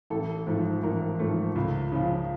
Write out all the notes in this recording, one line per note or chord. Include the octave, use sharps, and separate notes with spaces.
A1 A4
G#2 F3 A3
A1 A#4
G#2 F3 A3
C#2
C#3 F3